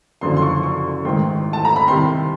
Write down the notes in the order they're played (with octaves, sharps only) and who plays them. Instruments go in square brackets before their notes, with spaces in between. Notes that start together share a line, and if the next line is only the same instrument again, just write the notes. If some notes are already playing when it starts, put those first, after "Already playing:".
[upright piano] F#1 F#2 D3 F3 C6
C6
C#6
C#6
A1 G#2 D#3 C6
A5
A#5
B5
C2 C3 D#3 C6